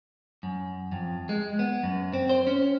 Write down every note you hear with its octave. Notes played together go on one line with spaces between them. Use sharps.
F#2
F2
G#3
B3
F#2
C4
C5
C#4